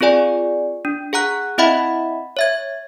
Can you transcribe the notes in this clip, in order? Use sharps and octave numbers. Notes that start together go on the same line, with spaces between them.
C4 F4 G#4 D5 G#5
D4
G#4 F#5 A#5 F#6
C4 E4 D#5 E5 F#5 B5
C#5 E5 G#6